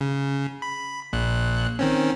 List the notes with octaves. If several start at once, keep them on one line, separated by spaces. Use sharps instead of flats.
C#3
B5
A#1 A#2 F#6
D#3 C4 C#4